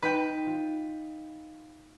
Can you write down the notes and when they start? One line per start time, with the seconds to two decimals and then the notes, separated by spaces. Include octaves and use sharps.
0.02 D#4 B4 G5
0.46 F4